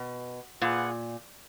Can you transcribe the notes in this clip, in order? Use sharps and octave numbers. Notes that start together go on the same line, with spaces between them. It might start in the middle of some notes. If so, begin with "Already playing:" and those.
Already playing: B2
A#2 F4 G#4 B4 F#5